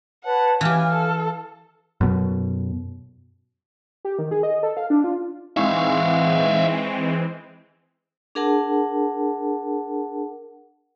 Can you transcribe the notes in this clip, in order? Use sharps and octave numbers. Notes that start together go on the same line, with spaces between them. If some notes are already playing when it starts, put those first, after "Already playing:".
B4 C#5 F#5 A5
E3 G4 F5 G#5 F6
A4
F#2 B2
G4
D#3
G#4
D#5
A4
F5
D4
F4
E3 G#3 C4 D#4 E5 F5 G#5 C#6
D4 G#4 A#4 F#5 A5